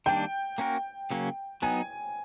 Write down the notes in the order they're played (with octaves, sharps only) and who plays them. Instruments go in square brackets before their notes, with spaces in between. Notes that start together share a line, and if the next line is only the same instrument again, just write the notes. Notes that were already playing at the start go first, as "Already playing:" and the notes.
[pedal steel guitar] D#3 G3 A#3 D4 [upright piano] G5
[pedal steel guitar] A#3 C#4 F#4 A#4
C#3 F#3 A#3 C#4
[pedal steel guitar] F#3 B3 D#4 [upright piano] G#5